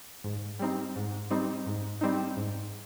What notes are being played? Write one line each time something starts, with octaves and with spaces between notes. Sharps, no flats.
G#2
G3 C4 D#4
G#2
G3 C4 D#4
G#2
G3 C4 D#4
G#2